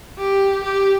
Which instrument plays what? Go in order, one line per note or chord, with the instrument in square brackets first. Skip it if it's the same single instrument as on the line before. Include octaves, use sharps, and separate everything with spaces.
[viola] G4
G4